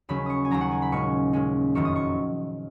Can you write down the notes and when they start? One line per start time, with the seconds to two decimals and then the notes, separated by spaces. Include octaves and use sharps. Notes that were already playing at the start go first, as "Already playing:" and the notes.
0.09 D#2 C#3 F#3 C#4 B5
0.26 C#6 D#6
0.45 G#5
0.51 D#2 C#3 F#3 C#4 A#5
0.61 F#5
0.71 G#5
0.82 B5
0.92 A#2 G#3 C#4 C#6
1.33 A#2 G#3 C#4
1.75 F#1 F2 D#3 F#3 C#6
1.85 D#6
1.96 C#6